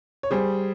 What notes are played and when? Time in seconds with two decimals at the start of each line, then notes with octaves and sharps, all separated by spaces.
0.23 C#5
0.31 G3 G#4 C5